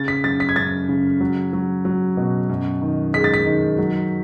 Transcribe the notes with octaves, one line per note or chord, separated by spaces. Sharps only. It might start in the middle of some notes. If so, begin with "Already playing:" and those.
Already playing: C#3 A6
B6
F#2 A6
B6
G#6
F#2 A6
C#3
F#3
F#3
F#3
B2
F#2
D#3
G#3 B6
A6
B6
D#3
F#3